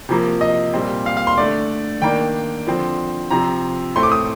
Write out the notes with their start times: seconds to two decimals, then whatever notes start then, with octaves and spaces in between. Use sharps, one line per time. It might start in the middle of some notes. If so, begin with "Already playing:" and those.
0.09 C3 F3 A#3
0.41 D#5
0.74 A#2 G3 C4
1.06 F5
1.17 F5
1.27 C6
1.38 D3 A3 D4 D5
2.02 D#3 A#3 D4 G5
2.67 D3 F3 C4
3.31 C3 F3 C4 A#5
3.96 A2 A3 C4 C6
4.03 D6
4.12 D#6